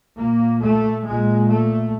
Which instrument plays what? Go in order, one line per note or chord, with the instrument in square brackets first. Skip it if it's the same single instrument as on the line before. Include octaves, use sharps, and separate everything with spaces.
[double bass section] A#2 A#3
A3
A#2 G#3
A3